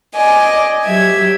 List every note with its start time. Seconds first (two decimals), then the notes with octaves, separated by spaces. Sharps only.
0.14 D5 D#5 G#5
0.83 F#3 G4 E5 G#6